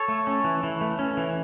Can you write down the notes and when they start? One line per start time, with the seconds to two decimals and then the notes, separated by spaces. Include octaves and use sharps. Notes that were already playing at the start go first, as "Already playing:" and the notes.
Already playing: A4 C#5
0.08 A3
0.27 C#4
0.44 E3
0.63 E3
0.81 A3
0.99 C#4
1.17 E3